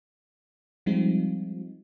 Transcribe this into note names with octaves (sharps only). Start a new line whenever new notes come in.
F3 G3 G#3 C4 D#4 F4